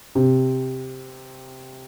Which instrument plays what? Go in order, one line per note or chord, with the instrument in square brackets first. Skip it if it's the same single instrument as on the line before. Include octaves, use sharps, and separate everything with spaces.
[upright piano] C3